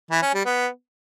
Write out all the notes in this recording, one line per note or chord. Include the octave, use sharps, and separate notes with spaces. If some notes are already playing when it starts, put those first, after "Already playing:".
E3
C#4
G3
B3